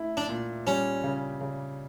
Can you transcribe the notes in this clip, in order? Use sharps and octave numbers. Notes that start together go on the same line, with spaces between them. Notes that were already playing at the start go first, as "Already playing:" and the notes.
Already playing: A3 E4
D4
A#2
G3 C#4
C#3
C#3